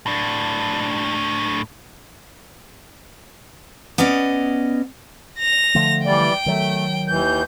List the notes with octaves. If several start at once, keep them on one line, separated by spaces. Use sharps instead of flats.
A2 D4
B3 C#4 D5 D#5
A#6 F7
D3 F3 A3
E3 G3 D5 G5
D#3 F#3 A3
D#2 E3 G6